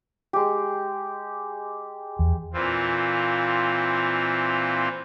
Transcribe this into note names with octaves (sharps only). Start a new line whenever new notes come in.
G#3 G4
E2
A#2 E3 C4 F4